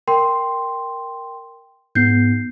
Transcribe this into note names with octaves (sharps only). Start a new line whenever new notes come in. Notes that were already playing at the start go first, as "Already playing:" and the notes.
A#4 G5 C6
G#2 B3 G6 C7